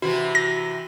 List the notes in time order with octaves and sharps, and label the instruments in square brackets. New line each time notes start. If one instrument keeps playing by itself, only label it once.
[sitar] C3 E3 E4 [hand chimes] F#4
[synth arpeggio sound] A#6